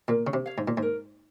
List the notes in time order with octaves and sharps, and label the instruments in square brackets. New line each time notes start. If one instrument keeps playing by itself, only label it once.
[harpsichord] A#2 [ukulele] A#4
[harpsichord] C#3
C3
[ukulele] C#5 F5
[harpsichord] G#2
A#2
[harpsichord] G#2 [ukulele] A#4